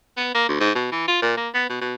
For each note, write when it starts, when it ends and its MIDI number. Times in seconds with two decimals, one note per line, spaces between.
0.17 0.33 59
0.35 0.48 58
0.48 0.56 38
0.60 0.74 44
0.75 0.90 47
0.92 1.05 52
1.08 1.20 65
1.22 1.37 46
1.37 1.49 58
1.54 1.67 59
1.69 1.79 47
1.81 1.94 47